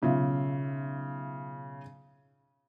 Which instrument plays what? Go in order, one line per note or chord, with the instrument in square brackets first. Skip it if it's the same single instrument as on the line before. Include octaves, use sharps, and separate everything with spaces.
[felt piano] B1 C#3 F4 E5